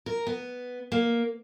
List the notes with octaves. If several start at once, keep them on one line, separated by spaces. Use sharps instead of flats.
A#4
B3
A#3